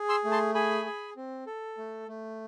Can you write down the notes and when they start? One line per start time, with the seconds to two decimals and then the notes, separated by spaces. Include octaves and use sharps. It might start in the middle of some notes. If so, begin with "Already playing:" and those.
Already playing: G#4
0.09 C6 E6
0.24 A3
0.31 A5 C6
0.55 G#4 G#5 B5
0.86 G#4
1.16 C4
1.47 A4
1.78 A3
2.08 A3